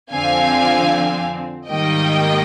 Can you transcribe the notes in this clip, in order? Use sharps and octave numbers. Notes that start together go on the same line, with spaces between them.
F2 D3 F3 C4 F5 G#5
G#2 D#3 G3 A#3 D#5 G5